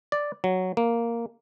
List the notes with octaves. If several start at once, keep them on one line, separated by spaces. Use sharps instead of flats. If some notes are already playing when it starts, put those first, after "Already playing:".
D5
F#3
A#3